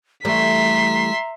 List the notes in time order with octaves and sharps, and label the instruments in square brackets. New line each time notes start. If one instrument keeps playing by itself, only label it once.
[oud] E3 G3 A3 [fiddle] E5 C6 [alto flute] A#5 [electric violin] B6